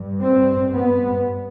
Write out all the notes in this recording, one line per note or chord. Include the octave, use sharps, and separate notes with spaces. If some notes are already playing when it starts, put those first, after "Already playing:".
Already playing: G2
C4
B3